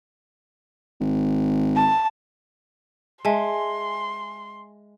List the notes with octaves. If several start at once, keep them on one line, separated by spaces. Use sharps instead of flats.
G#1
A5
G#3 E5 G#5 A5 C6